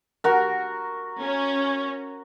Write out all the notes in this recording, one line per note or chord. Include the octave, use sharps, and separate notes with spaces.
F#4 A#4
C#4